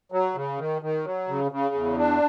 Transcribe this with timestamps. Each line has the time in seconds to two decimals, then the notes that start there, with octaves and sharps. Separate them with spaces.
0.12 F#3
0.35 C#3
0.58 D#3
0.82 D#3
1.05 F#3
1.28 C#3
1.52 C#3
1.75 E2
1.98 D4